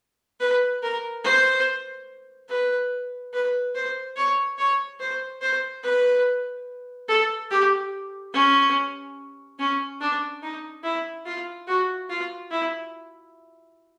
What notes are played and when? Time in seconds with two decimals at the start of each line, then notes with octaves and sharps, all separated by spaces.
0.40 B4
0.82 A#4
1.24 C5
2.49 B4
3.33 B4
3.75 C5
4.16 C#5
4.58 C#5
5.00 C5
5.41 C5
5.83 B4
7.08 A4
7.51 G4
8.33 C#4
9.59 C#4
10.01 D4
10.42 D#4
10.84 E4
11.26 F4
11.68 F#4
12.09 F4
12.51 E4